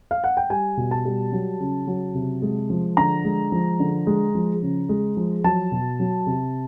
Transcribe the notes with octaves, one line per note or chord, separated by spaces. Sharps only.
F5
F#5
G5
G3 G#5
B2
A5
G3
F#3
C#3
F#3
C3
G#3
F3
D3 A#5
G#3
F3
D3
G#3
F3
C#3
G#3
F3
F#3 A5
B2
F#3
C3